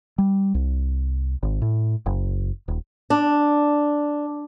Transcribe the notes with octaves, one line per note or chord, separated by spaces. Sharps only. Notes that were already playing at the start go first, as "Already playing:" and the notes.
G3
C2
G#1
A2
F#1
D#1
D4